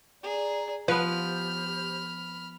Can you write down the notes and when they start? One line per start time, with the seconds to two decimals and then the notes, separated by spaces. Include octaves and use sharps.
0.23 G#4 D5 A#5
0.88 F3 B3 G4 B4 C5 B5 F6